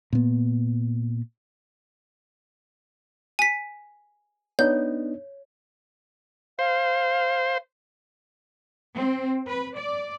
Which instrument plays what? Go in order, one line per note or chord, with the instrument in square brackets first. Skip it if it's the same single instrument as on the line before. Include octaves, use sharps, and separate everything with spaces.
[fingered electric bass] A#2 B3
[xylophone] G#5 B6
[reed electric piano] B3 D4 D#4 [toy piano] C#5 [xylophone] G6
[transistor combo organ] C5 [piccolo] F5
[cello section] C4
B4
D5